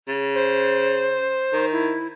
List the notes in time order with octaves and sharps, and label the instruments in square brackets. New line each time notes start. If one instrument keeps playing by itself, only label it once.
[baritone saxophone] C#3
[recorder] C5
[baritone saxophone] D#3
[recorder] E4